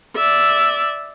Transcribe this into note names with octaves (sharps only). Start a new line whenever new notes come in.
D5 E5